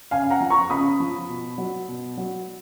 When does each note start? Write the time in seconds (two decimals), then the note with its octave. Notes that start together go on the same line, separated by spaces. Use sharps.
0.11 C#3 F5 G#5
0.30 F#5 A#5
0.40 F3
0.50 A#5 C#6
0.70 C#3 B5 D#6
1.00 F3
1.28 B2
1.58 F#3
1.88 B2
2.17 F#3